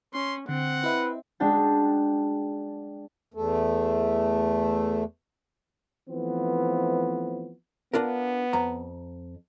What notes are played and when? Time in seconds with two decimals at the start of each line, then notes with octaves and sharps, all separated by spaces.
0.13 C#4 C6
0.49 D3 C4 F#5
0.84 E4 B4 D#5 E5
1.40 G#3 D4 F#4 G5 A5
3.34 E2 A3
6.10 E3 F3 A3 B3 C4
7.93 B3 D4 F4 A#4
8.53 F2 A#5